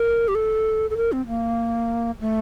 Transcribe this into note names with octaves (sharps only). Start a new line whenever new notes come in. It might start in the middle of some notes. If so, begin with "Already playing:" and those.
Already playing: A#4
G4
A4
A4
A#4
C4
A#3
A3